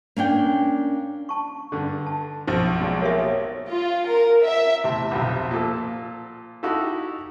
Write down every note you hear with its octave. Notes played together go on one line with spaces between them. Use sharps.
A#3 C#4 D4 G5
A5 C#6
G2 D3
A5
B1 F3
F#3 G#3 D5
A#3 G4 C#5 E5
F4
A#4
E5
E2 C3 A3
B1 F2 C3
A#2 F3 A4
D#4 E4 F#4 G4 A4